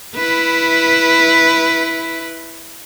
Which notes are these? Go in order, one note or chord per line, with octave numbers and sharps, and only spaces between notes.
E4 B4